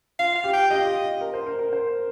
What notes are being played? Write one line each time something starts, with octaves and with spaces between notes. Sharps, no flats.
F4 F5
F5
G4
G5
G4 D#5
F4
G4
A#4
C5
A#4
A#4
C5